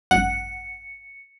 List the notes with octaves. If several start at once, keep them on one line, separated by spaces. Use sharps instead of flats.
G#1 F#2 F#5 C#7